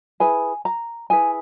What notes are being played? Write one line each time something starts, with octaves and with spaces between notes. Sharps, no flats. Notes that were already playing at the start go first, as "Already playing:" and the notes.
E4 G#4 B4 G#5
A#5
E4 G#4 B4 G#5